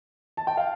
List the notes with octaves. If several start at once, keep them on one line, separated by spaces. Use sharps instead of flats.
A5
G5
F5